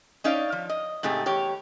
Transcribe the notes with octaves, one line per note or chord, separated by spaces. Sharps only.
C#4 D#4 C#5 D5 F5
F3
D#5
G#2 C3 A3 G4 G#4
E2 G4 C#5